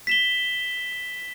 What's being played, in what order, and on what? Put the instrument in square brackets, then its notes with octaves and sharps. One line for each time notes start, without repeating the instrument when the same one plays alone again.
[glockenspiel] B6 E7 G7